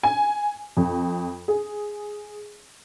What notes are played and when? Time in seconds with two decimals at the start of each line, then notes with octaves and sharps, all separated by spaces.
0.03 G#5
0.77 F2
1.48 G#4